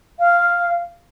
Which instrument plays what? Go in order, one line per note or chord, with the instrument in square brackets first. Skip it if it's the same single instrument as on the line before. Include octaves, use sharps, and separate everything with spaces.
[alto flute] F5